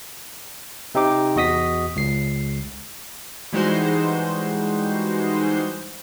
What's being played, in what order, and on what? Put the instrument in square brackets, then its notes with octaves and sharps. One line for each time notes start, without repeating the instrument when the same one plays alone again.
[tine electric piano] C3 C4 D#4 G4 D6
E2 F#4 D#5 D#6 B6
C#2 C7
[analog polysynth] E3 G3 G#3 D#4 F#4 C5